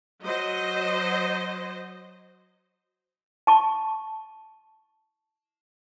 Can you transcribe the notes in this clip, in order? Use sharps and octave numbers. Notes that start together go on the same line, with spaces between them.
F#3 C5 D#5
A5 C#6